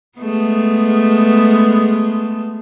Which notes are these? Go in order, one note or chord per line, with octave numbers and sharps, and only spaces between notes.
G#3 A3 B3